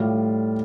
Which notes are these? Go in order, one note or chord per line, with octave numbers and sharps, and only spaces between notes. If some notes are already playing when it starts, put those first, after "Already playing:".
Already playing: A2 G3 F4